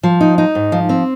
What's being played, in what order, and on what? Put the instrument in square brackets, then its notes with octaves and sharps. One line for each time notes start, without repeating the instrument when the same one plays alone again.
[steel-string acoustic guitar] F3
D#4
D#4
G#2
F3
C4